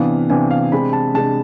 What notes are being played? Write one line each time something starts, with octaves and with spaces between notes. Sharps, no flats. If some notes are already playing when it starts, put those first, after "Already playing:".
Already playing: C3 E3 B3 D4 F5
C3 E3 B3 D4 G#5
F5
C3 G#3 D4 B5
A5
C3 G#3 D4 A5